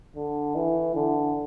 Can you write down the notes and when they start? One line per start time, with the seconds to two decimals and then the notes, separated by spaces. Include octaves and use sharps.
0.16 D3
0.55 E3
0.95 D3